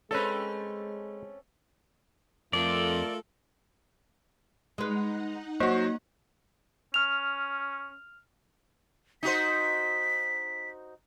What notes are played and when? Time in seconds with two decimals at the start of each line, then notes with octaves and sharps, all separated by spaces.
0.11 G#3 A3 C4 C#4 A4 B4
2.53 F2 A3 F4 A4 A#4 D5
4.78 G#3 D#4 B4 F#5 A#5
5.60 F#3 A#3 F#4 C5
6.94 C#4 F6 F7
9.23 D#4 F#4 C5 B6